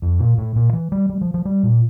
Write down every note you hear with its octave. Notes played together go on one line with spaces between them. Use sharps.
F2
A#2
A2
A#2
E3
G3
G3
F3
F3
G3
A#2